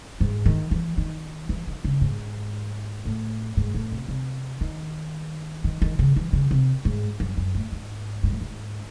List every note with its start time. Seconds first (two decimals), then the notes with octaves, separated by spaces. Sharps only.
0.21 G#2
0.46 D#3
0.71 E3
0.98 D#3
1.49 E3
1.67 D#3
1.84 C#3
2.01 G#2
3.05 A2
3.57 G#2
3.74 A2
3.92 C3
4.08 C3
4.61 D#3
5.64 D#3
5.82 D#3
5.99 C#3
6.16 E3
6.33 C#3
6.51 C3
6.85 G#2
7.20 F#2
7.37 F#2
7.55 A2
7.72 G#2
8.23 G#2
8.32 A2
8.41 G#2